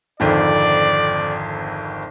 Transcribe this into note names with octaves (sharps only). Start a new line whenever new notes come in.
G#1 F2 D3 D5